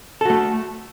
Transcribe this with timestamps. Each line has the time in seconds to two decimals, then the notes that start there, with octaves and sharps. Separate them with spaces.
0.21 A4
0.25 F#4
0.30 A3